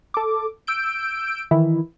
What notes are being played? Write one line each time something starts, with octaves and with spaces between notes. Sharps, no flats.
A4 D6
E6 G6 D7
D#3 E3 E4